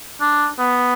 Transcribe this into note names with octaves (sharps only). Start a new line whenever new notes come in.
D4
B3